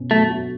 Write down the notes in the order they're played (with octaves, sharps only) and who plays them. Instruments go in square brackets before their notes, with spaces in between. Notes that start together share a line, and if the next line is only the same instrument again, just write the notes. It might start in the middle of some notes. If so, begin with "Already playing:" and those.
Already playing: [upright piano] B2 C#4
[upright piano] F#3 [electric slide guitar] A3
[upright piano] F#4